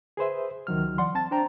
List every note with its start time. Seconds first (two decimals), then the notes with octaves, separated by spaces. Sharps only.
0.17 G#4 B4 C5 E5
0.67 C#2 D#3 F#3 F6
0.98 E3 D5 F#5 C6
1.14 C2 C4 A5 A6
1.31 D4 C5 G5 A#5